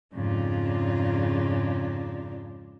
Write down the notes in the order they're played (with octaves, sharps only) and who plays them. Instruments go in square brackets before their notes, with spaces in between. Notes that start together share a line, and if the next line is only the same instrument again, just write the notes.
[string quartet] F2 G#2 C#3 D4 D#4 F4